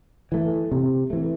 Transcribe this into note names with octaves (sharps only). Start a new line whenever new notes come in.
E3 A3
C3
E3 A3